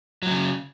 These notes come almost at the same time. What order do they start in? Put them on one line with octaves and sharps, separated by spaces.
F#3 A2 C#3